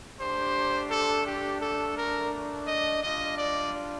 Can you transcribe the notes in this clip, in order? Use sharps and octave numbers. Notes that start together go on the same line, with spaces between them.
A3 D4 G4 C5
A4
G4
A4
A#4
D#5
G3 D4 F4 D#5
D5